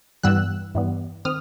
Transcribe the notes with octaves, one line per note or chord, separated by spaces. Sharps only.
G2 E3 G3 B3 E6 F#6
G2 E3 G3 B3
D#3 C4 D#6 F6